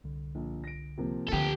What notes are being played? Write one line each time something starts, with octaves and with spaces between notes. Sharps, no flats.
C2 D3
A#1
A#6 D7
C3 F3 A#3
D2 D3 G4 A4